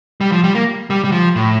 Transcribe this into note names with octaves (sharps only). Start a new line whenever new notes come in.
G3
F3
G3
A#3
G3
G3
F3
A2